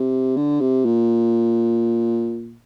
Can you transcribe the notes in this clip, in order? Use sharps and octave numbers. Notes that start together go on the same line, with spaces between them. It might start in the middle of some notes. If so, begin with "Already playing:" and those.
Already playing: C3
D3
C3
A#2